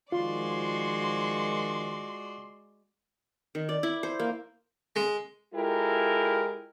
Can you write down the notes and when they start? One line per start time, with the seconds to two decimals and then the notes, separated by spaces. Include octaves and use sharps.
0.12 D#3 F3 G#3 F4 F#4 D5 C6
3.55 D#3
3.69 D5
3.83 E4
4.03 C5
4.20 A#3
4.96 G#3
5.55 G#3 E4 F4 G4 A4 A#4